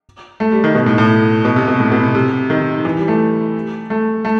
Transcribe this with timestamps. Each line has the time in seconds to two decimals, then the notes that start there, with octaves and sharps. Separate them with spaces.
0.40 A3
0.52 G3
0.64 D#3
0.75 B2
0.86 A2
0.98 A2
1.45 B2
1.56 C3
1.68 B2
1.80 A2
1.92 B2
2.03 C3
2.15 C3
2.50 D#3
2.85 E3
2.97 G3
3.08 A3
3.90 A3
4.25 A3